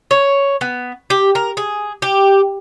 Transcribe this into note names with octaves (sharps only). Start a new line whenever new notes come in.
C#5
B3
G4
A#4
G#4
G4